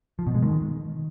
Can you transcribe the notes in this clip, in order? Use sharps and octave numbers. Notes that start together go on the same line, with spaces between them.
F3
B2
G#3
D#3